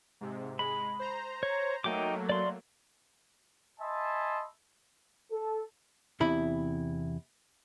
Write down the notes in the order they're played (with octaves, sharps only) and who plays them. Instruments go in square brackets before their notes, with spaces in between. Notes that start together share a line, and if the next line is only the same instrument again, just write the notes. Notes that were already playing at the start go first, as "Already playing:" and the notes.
[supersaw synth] G#2 C3
[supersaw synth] G#3 [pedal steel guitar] B5
[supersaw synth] C5 A#5
[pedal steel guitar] C#5
[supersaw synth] F#3 A3 A#3 [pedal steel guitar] D#4 G5 D6
[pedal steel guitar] D5 C6
[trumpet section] D#5 E5 G#5 A5 B5 C6
[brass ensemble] A4
[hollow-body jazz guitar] E2 C3 E4 B5